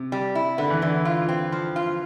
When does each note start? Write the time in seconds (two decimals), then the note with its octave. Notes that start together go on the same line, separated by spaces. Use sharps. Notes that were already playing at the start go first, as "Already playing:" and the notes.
Already playing: C3
0.12 G3
0.35 E4
0.58 D3 B3
0.70 E3
0.82 D3 E3
1.05 F4
1.29 C4
1.52 F3
1.76 F4